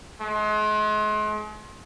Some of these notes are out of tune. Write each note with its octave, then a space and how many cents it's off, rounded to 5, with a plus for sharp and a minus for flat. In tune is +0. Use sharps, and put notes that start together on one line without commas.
G#3 +40